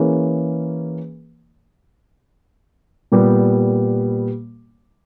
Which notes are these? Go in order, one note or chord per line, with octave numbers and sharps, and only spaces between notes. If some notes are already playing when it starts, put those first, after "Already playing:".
Already playing: E3 A#3 C#4 G#4 B4
A#2 G3 B3 G4